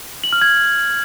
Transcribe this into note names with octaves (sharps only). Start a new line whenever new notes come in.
F#7
F6
G#6